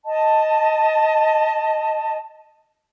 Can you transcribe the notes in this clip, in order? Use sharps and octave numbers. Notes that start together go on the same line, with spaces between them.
D#5 A5